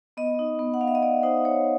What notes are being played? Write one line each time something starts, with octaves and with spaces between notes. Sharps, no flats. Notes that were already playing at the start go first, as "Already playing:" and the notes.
B3 D#5
D#4
B3
F#5
B3 F5
E5
D#5
B3 D5
D#4 C5
D#4 C#5